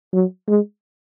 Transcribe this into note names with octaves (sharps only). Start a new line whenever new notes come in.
F#3
G#3